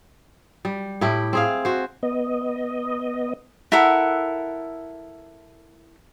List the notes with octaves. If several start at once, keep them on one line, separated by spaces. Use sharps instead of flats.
G3
A2 E4 G4
C4 G#4 F5
F#4 C5
B3 D#5
E4 A4 A#4 F#5